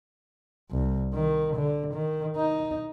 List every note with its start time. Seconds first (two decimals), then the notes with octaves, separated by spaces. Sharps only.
0.71 C2
1.14 D#3
1.56 D3
1.94 D#3
2.37 D#4